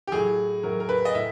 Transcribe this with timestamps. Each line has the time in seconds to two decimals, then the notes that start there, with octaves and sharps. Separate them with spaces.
0.07 G4
0.12 A2 F#3 G#4
0.63 A2 F#3 A#4
0.80 A#4
0.89 B4
1.05 D#5
1.15 A2 E5